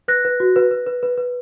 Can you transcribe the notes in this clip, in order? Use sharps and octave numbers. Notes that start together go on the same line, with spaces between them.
B4 F#6 A#6
B4
F#4
B4
B4
B4
B4
B4